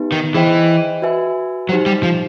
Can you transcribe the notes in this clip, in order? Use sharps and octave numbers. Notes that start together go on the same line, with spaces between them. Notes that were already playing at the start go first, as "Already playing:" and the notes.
Already playing: B3 D#4 G4 B4
D#3
E3 G#4 C5 D#5 G5
F#4 B4 E5 G#5
F#3 D#4 G4 C5
G3
F3